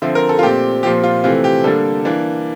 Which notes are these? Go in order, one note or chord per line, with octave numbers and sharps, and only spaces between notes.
D3 F3 C4 E5
A#4
A4
F4
A#2 A3 C4 G4
A#2 F3 C4 G4
F4
C3 E3 A3 C4 F4
G4
D3 G3 A#3 D4 A4
E3 A#3 D4